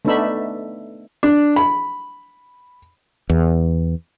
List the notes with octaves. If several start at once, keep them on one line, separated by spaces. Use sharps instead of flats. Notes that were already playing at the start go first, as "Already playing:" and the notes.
A3 B3 D4 D#4 E5 B5
D4
B5
E2